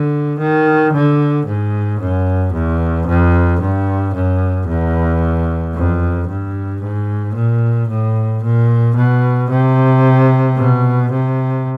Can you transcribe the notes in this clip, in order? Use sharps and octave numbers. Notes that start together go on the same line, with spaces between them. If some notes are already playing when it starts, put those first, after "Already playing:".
Already playing: D3
D#3
D3
G#2
F#2
E2
F2
G2
F#2
E2
F2
G2
G#2
A#2
A2
A#2
B2
C3
B2
C3